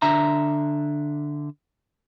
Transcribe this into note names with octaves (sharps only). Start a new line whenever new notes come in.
D3 D4 E5 A#5